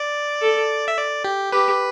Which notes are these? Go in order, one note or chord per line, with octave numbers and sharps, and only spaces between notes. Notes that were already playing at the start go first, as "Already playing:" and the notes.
Already playing: D5
A4
E5
D5
G4
G4 B4